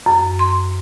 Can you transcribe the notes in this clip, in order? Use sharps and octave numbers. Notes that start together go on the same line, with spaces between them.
F#2
C6